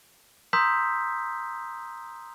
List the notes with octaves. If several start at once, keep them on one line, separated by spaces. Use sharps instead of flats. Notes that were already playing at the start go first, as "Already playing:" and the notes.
A#5 C6 D#6 E6 G6 B6